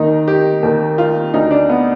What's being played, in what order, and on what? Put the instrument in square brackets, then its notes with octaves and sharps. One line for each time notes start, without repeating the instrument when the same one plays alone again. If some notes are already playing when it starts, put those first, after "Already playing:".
Already playing: [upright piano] D#2 D#3 D#4
G4
D#2 D#3
F4
D2 D3 D#4
D4
B3